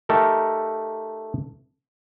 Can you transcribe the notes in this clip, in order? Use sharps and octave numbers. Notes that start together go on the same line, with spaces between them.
A3 D#4 G4 A4 A#4